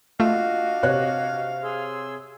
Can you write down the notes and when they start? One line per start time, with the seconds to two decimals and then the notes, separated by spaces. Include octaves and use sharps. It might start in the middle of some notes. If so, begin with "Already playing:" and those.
0.20 A3 D4 F4 F#4 D#5 F5
0.83 C3 C#5 F#6
1.62 G#4 C6 E6